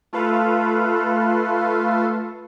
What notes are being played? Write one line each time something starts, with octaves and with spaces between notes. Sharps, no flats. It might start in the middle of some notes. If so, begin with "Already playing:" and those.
A3 F4 A4 B4 F5